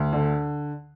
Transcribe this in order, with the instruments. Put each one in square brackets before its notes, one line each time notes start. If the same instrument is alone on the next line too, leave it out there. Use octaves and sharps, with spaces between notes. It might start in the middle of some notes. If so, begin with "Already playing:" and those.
Already playing: [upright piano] D2
D3